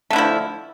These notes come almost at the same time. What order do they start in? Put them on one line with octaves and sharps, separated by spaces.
A3 D3 E4 F3